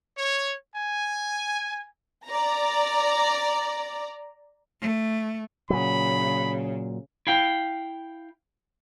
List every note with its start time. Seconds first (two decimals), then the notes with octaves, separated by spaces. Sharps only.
0.17 C#5
0.76 G#5
2.27 D5 A#5
4.81 A3
5.70 A#2 C#3 F#3 B5
7.27 E4 F5 G5